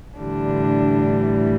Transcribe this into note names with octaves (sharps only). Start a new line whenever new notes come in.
A2 D3 E3 G3 D4